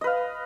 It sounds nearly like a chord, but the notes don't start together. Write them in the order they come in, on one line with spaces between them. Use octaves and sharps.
D#5 B4 F5